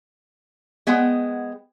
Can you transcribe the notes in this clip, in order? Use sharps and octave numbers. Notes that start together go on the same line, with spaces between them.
G#3 B3 C5 F#5 G5